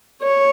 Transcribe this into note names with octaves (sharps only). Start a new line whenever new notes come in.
C#5